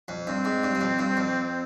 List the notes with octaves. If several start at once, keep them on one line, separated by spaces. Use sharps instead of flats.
F2
G2 C4
G#2
G2
G2
F2
G2
F2